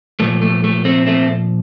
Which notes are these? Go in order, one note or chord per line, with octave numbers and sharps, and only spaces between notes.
A#2 F3 A3
A3
A3
A3 C4
A3 C4